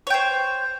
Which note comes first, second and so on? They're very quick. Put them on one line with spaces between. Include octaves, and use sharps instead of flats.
C#5 G5 C5